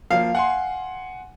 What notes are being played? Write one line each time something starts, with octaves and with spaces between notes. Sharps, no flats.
F3 A#3 F5
F#5 G#5 C6